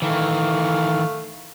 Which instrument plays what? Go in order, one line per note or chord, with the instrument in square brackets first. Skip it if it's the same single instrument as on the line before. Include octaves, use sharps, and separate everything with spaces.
[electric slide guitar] D#3 E3 [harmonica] A3 F5